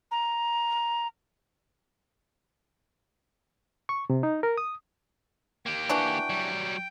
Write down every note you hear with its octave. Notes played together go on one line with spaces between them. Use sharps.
A#5
C#6
C3
D#4
A#4
D#6
A#3 G4 G5
E3 D4 F#4
F#3 G3